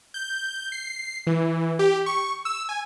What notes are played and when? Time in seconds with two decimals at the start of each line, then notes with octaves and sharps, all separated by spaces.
0.14 G6
0.72 C7
1.27 E3
1.79 G4
2.06 C#6
2.45 E6
2.69 G#5